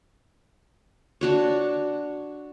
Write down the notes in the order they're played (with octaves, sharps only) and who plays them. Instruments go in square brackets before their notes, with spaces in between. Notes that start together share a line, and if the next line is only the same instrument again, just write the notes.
[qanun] D4 F#4 C#5